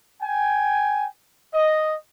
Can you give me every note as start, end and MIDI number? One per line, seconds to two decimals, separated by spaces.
0.22 1.07 79
0.22 1.07 80
1.54 1.94 75